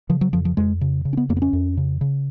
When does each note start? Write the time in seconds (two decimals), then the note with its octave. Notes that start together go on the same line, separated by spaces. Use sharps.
0.09 C#3 F3
0.21 F#3
0.33 F2 F3
0.45 F3
0.57 F2 G#3
0.81 C#3
1.05 C#3
1.13 C#4
1.17 B3
1.29 F2 A#3
1.37 B3
1.42 C#4
1.53 F2
1.77 C#3
2.01 C#3